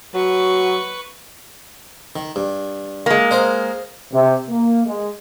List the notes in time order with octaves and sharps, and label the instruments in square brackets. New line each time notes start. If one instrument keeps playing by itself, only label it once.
[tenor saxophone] F#3 [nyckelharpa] B4 C#6
[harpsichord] D#3
G2
[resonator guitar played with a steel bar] G#3 A#3
[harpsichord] A#4 C5 D#5
[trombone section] C3
A#3
G#3